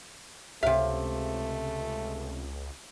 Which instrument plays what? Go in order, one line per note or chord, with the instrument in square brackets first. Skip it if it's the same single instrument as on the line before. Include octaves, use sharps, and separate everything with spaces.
[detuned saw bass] C#2 [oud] C3 F5 [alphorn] A3 [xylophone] E5